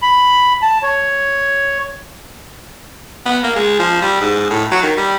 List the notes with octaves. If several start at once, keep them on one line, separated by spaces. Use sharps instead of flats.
B5
A5
C#5
B3
A#3
G#3
F3
G3
G#2
A2
F#3
D#3
G3